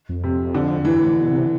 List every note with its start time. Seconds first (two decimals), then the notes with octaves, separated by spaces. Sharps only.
0.09 F2
0.23 C3
0.55 D3
0.84 G2 E3
1.00 A2
1.15 B2
1.30 C3